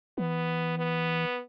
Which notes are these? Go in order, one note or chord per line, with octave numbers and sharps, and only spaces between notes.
E3 B3
B3